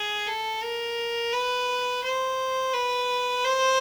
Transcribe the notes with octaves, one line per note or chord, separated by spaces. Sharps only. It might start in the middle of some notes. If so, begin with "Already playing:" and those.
Already playing: G#4
A4
A#4
B4
C5
B4
C5